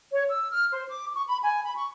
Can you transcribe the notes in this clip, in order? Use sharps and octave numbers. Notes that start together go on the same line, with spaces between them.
C#5
E6
F6
C5
D6
C#6
B5
G#5
B5
C#6